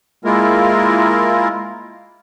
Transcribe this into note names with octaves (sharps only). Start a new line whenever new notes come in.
G#3 A#3 E4 F4 A#4